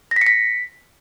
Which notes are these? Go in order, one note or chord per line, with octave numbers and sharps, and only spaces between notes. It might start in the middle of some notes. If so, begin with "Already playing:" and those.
A#6
B6
C#7
B6